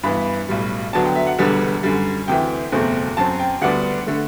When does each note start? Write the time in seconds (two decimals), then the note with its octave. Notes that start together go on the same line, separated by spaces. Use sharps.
0.03 G2 E3 B3 B5
0.49 B1 A2 G3
0.93 D2 D3 F#3 B3 D4 A5
1.05 G5
1.15 E5
1.27 F#5
1.38 E1 E2 D3 G3 B3
1.83 F#2 D3 G3
2.28 D2 C3 E3 G5
2.72 F#1 E2 B2 A3 C4
3.17 F#2 F#3 C4 A5
3.39 G5
3.61 D2 D3 G3 B3 D4 F#5
4.07 D3 A3